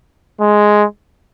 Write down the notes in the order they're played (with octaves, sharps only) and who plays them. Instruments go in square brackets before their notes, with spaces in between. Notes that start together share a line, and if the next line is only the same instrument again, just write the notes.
[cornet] G#3